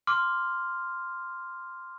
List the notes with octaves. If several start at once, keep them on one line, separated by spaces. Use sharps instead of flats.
C6 D6 F6